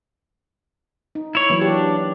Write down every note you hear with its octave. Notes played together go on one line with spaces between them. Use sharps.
D#4
E4 C#5
E3 F#3 A#3
D4 G4